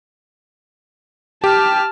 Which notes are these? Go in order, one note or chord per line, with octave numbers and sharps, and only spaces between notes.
G4 A5 F6